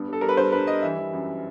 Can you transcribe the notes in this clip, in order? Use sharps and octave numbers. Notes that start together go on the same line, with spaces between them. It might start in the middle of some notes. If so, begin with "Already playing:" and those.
Already playing: G2 B3
G3 A4
G3 A#4
B4
G2 C5
G2 B4
G3 D#5
E3 E5
E3
F#2